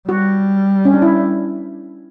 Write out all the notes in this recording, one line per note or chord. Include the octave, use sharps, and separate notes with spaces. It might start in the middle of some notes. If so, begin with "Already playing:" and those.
G3 F#4
C#4
D4
E4